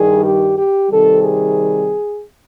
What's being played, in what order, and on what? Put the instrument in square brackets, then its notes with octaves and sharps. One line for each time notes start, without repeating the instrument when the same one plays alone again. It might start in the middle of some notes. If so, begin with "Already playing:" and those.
Already playing: [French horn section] G2 D#3 G3 G#4
G4
G4
C3 D#3 G3 C4 A4
G#4